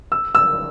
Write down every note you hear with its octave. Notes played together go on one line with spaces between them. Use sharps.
E6
E6